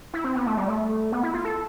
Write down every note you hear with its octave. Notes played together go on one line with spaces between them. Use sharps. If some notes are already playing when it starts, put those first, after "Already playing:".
E4
C4
B3
A3
G3
A3
B3
E4
F4
A4